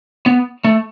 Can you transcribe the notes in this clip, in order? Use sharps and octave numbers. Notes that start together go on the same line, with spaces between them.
B3
A3